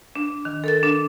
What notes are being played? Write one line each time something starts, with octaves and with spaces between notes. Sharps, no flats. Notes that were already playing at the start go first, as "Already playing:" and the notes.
D4
D#3
A4 A#4 A6
D4